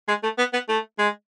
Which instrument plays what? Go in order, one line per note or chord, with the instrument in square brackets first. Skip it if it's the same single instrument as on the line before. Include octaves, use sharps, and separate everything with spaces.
[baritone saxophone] G#3
A3
B3
B3
A3
G#3